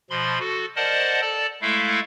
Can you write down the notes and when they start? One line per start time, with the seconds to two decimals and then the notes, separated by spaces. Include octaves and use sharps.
0.10 B2 F3 B5 C6
0.40 F#4 A4
0.76 A#4 C5 D5 D#5 F#5 A5
1.21 A4 D5 A5
1.62 G#3 A3 E4 A4 E5 F5